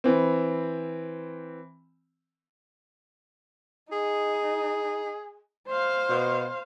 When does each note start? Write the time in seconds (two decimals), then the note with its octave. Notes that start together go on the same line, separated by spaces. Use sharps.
0.04 E3 C4
3.92 D#4 G#4
5.68 C5 F5
6.09 B2